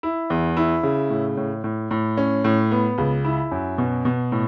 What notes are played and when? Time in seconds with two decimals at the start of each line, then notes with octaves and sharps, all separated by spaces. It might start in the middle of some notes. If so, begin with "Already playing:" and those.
0.03 E4
0.30 E2
0.57 E4
0.83 C#3
1.10 A2
1.37 A2
1.64 A2
1.91 A2
2.17 C#4
2.44 A2
2.71 B3
2.98 C#2
3.25 E4
3.51 F#2
3.78 B2
4.05 B2
4.32 A2